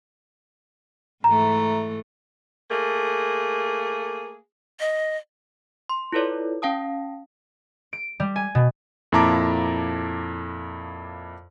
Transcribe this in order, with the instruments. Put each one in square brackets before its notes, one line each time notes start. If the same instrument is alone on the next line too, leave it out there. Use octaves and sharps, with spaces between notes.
[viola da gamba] G#2 E3 A3 [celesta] A#5
[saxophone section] A3 A#3 G#4
[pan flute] D#5
[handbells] C6
E4 F4 A4 B4 C#5 D5
C#4 F5 G5 A5 D#6
[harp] D7
G3
G#5
B2
[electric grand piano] F2 A#2 E4 A5 A#5 D6